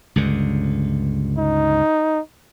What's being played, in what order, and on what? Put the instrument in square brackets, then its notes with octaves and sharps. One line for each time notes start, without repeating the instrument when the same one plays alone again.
[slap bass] C#2 G2 D3
[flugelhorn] D#4